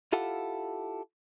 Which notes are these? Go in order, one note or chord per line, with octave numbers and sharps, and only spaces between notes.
E4 F4 G4 A4 F5 F#5